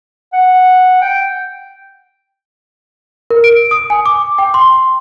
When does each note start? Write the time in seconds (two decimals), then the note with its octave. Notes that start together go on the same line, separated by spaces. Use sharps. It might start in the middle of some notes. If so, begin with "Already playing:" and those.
0.33 F#5
1.02 G5
3.30 A#4
3.44 D7
3.71 D#6
3.90 G#5
4.06 D6
4.38 G5
4.54 C6